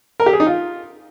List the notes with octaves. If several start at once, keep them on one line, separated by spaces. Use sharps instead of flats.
A#4
G4
G#4
D#4
F4